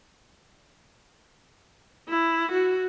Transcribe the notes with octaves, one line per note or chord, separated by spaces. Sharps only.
E4
F#4